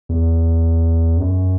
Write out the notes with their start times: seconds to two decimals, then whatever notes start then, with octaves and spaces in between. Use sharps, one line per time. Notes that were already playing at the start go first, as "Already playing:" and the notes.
0.09 E2
1.17 F#2